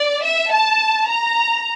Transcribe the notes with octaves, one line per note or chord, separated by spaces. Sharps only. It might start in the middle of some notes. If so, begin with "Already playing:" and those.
Already playing: D5
E5
A5
A#5